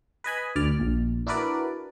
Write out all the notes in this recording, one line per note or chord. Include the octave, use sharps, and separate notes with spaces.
B4 D#5 G#5 B5
D2 D5 F6
A#1
D4 E4 F#4 A#4 B4 D5